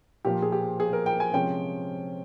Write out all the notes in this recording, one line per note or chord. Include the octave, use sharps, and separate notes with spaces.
A#2 F3 A#3 G4
G#4
G4
G#4
A#4
G5
G#5
C3 F3 G#3 C#4 G5